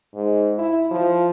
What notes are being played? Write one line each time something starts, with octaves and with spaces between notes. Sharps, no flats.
G#2
E4
F3